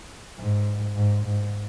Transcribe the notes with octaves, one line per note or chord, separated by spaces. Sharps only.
G#2
G#2
G#2